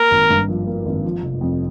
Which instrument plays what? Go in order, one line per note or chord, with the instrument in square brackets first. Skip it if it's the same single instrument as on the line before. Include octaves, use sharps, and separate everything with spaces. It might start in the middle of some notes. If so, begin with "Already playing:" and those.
Already playing: [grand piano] A#3 [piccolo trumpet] A#4
[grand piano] G#1
G2
F3
A#3
G#1
F3
F1
F2